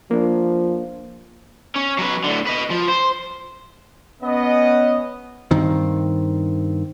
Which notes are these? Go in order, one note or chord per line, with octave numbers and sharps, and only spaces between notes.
F3 A#3 D4
C#4
F#3 B4
A2 D3
B4 D#5
F3
C5
B3 C#4 D#5
G2 D#3 C4